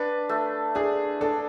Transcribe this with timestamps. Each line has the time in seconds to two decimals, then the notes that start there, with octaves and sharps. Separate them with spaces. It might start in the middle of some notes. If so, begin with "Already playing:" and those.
Already playing: D4 B4
0.29 A3
0.75 D4 G#4
1.21 D4 A4